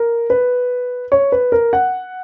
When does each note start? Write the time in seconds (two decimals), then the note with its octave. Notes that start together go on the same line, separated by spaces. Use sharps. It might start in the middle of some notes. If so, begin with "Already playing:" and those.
Already playing: A#4
0.30 B4
1.12 C#5
1.32 B4
1.52 A#4
1.73 F#5